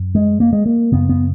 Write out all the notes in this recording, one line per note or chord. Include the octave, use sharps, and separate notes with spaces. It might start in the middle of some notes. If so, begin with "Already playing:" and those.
Already playing: F#2
G#3
A#3
G#3
A#3
F#2 C#3 B3
B3